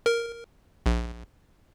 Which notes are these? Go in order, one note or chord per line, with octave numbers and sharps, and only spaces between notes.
A#4
A#1